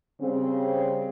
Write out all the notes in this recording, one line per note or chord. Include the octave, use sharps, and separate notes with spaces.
C#3 G3 C4